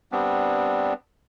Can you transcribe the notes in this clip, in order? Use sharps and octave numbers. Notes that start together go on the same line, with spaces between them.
G3 B3 C4 D4